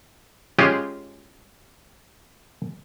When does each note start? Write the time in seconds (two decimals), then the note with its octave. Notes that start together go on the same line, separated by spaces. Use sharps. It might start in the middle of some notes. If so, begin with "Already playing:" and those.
0.59 G#3 C#4 F4 G4 G#4